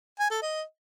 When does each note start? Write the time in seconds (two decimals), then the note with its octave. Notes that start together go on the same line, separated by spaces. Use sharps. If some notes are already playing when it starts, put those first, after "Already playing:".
0.19 G#5
0.31 A4
0.42 D#5